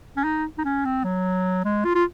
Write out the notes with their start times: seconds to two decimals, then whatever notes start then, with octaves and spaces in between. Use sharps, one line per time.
0.17 C#4
0.24 D#4
0.58 D#4
0.65 C#4
0.85 C4
1.04 F#3
1.64 G#3
1.85 F4
1.95 F4